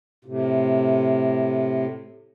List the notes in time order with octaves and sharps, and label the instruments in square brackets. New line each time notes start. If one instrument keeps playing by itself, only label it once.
[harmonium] A2 C3